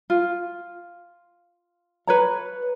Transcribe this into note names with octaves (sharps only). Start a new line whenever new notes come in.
F4
B4 C#5 A#5